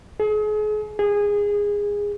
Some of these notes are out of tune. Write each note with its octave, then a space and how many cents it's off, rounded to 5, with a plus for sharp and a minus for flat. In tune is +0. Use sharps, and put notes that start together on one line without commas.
G#4 +35
G#4 -20